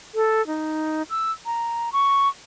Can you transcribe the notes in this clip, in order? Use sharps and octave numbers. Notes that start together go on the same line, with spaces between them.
A4
D#4
E6
A#5
C#6